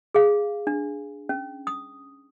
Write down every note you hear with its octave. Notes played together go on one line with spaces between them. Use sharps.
G#4 F5
D4
C#4
D#6